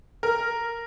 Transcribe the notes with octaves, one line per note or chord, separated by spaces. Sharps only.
A#4